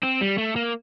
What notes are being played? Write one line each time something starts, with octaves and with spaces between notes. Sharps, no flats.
C4
G3
A3
A#3